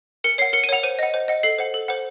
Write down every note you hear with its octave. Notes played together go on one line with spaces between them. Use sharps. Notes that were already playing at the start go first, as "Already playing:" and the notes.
A#4 C#7
C#5 F#5 C7
A#4 C#7
D#7
C#5 F#5 F7
C5 D#7
D#5 F#5
C5
D#5 F#5
A4 C7
C5 F#5
A4
C5 F#5